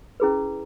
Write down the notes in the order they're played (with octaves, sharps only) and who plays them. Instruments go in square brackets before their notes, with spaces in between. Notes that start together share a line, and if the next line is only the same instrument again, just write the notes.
[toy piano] C#4 E4 G#4 B4